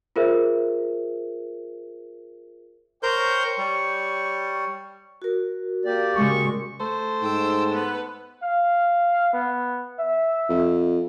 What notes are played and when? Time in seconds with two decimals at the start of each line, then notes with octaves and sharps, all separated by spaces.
0.16 F4 G#4 A#4 C5 E5
3.03 A#4 C5 C#5 G5 C#6 G6
3.58 G3
5.22 F#4 A#4
5.85 A#3 G4 D5
6.16 C#3 G#3 C#6
6.80 A3 C5
7.23 G#2 G5 E6
7.71 B3 B4
8.43 F5
9.33 B3
9.99 E5
10.49 F2